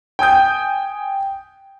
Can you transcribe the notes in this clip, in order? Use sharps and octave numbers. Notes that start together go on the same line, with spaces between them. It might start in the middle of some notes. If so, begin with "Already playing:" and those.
G5 G#5 D#6 G6